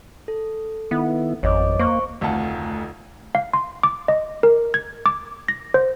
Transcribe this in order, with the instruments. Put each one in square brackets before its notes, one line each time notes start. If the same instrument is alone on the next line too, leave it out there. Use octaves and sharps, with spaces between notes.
[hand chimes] A4
[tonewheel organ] D#3 E4 [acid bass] B3
[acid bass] G#1 [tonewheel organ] F2 [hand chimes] C#5 D#5 D6
[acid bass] A#3 [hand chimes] C5 C#6
[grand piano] F1 D2 D#3 F4 F#5 A5
[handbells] F5
C6
D6
D#5
A#4
G#6
D6
A#6
C5